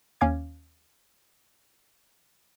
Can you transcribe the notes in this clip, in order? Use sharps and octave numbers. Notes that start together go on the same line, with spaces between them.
D#2 C#4 F5 D6 G#6